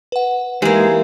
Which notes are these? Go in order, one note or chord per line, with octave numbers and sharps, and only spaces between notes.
B4 F#5
E3 G#3 A#3 D#4 G4 G#4 B4